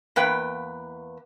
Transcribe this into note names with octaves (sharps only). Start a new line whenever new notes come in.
E2 A#3 B4 G5